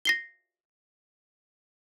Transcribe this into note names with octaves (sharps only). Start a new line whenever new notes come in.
A#6 C7 G7